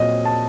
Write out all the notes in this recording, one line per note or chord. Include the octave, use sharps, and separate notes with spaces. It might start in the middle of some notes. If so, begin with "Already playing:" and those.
Already playing: A#2 F#3 C4 D#5
A5